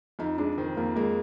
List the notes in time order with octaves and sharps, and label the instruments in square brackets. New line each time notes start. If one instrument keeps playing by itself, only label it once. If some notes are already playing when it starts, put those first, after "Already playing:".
[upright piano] F2 [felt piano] D#4
[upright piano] G#3 [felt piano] D4
[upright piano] D#3 [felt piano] C4
[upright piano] F2 [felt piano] A#3
[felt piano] G#3 [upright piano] A#3